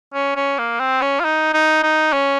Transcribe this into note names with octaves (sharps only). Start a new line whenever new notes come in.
C#4
C#4
A#3
C4
C#4
F4
D#4
D#4
D#4
C#4